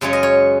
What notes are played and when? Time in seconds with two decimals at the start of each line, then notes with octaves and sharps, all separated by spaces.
0.01 F#2 C#3 G#3 C#4 C#5
0.13 D#5
0.23 C#5